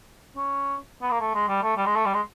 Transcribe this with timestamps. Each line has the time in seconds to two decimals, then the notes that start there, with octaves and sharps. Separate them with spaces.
0.37 C#4
1.02 B3
1.11 A#3
1.20 A3
1.35 G#3
1.48 G3
1.63 A3
1.77 G3
1.86 G#3
1.96 A3
2.05 G3
2.14 G#3